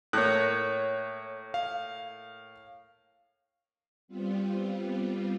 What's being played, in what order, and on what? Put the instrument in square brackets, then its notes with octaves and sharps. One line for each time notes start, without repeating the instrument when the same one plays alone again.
[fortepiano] A2 A#3 [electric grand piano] C#5 F#6
[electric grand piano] F5
[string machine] G3 B3 C4 F4